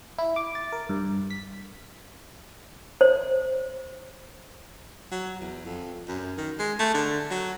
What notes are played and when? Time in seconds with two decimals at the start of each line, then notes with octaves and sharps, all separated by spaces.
0.18 E4
0.36 D6
0.55 A6
0.72 A#4
0.89 G2
1.30 B6
3.01 C5
5.12 F#3
5.41 E2
5.66 F2
6.08 F#2
6.38 D#3
6.59 G#3
6.79 A3
6.95 D3
7.31 F#3